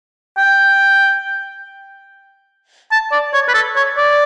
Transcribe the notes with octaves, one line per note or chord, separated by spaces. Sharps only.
G5
A5
D5
C#5
B4
A4
C#5
D5